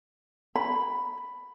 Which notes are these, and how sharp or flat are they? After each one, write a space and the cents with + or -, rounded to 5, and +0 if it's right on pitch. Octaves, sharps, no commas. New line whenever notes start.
B5 +5